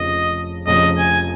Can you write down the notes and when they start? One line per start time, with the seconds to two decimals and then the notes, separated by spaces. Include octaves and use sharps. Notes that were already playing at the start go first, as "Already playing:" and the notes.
Already playing: F1 F2 C#3 F3 D#5
0.67 F1 F2 C#3 F3 D#5
0.99 G#5